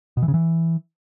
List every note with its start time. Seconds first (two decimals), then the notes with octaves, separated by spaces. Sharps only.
0.17 B2
0.23 E3
0.28 C#3
0.34 E3